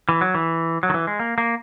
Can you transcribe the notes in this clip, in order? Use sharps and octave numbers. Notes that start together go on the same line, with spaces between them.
E3
F#3
E3
F#3
D#3
E3
G#3
A#3
A#3